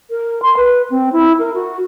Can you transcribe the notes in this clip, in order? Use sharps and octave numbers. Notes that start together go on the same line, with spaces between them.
A#4
C6
B4
C4
E4
A#4
F#4